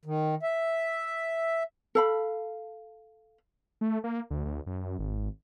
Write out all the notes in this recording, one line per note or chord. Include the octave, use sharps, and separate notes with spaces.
D#3
E5
A4 F5 B5
A3
A#3
D2
D2
F#2
G#1